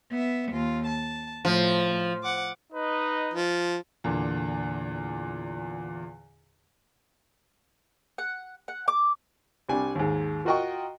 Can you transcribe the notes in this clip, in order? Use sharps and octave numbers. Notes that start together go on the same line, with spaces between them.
B3 E5
D#2 F4
A5
A2 F3
F#5 D6
D#4 B4 D#5
F3
E2 A#2 D3
F#5
F#5
D6
C2 G3 D4 G#5
D#2 G#2
F4 F#4 A#4 D#5 G5 C#6